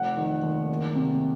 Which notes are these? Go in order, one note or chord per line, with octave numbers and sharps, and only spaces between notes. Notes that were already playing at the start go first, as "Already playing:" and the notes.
Already playing: F1 F#5
D#3
D#2
F#1
C3